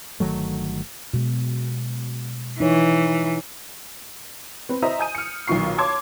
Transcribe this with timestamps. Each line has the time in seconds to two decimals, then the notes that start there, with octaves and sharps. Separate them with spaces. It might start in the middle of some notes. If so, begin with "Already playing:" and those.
0.20 G1 D#3 F#3 A3
1.14 B2 G#3
2.60 E3 D#4 C#5
4.69 C4 B4
4.82 C5 D#5 E5 A#5 D#6
4.99 G#5 G6 D#7
5.15 F6 C#7
5.48 B1 A#2 D#3 F4 C#6 C7
5.78 C#5 A5 C6 D6 G#6